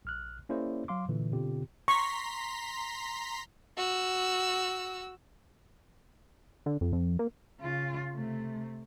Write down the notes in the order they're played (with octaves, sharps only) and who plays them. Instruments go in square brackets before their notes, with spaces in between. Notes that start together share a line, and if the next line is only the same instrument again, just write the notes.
[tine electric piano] A#1 F6 F#6
A#3 C#4 E4 G#4 C5 D5
F#3 F5 C6 D6
A#2 D3 E3
B2 D3 C4 F4 G4
[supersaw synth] A#5 C6 B6 [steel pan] C#6
[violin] F#4 E6
[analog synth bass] D3
F2
F2
A#3
[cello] C#3 F4
C3 A3